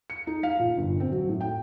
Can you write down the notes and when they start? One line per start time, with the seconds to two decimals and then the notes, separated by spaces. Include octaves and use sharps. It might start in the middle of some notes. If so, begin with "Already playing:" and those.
0.10 C#7
0.27 D#4
0.43 F5
0.59 A#2
0.77 G1
1.00 C4
1.12 F#3
1.29 A2
1.41 G5